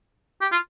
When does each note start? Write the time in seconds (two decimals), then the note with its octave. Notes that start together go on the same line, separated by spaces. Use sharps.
0.41 G4
0.52 F4